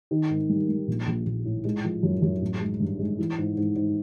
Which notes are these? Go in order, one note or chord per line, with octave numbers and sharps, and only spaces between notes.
D#3
G#2
G3
G3
A#1
A#1
A#1
A2
G#3
F3
F#2
F#2
A1
G#3
G2
G#3
E3
G#2
G#2
G#2